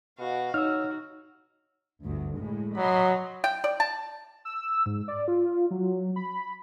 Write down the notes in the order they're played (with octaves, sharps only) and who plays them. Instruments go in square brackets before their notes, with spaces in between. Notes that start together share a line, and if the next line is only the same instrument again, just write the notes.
[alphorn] B2 [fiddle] F#4 F5
[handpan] D#4 [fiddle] F#4 [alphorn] C#5 [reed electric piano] E6 F6
[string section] G1 D2
A2 G#3
[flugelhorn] F#3 [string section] D#5 B5 C6
[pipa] G5
D5
A5
[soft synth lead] E6
G#2
D5
F4
F#3
B5